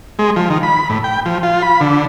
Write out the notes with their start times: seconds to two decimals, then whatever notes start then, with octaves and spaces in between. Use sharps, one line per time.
0.19 G#3
0.36 F3
0.50 D#3
0.63 B5
0.90 A2
1.04 G5
1.26 F3
1.43 F4
1.62 B5
1.80 D3